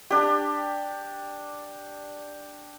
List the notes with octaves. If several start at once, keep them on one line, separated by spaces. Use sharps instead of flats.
D4 G4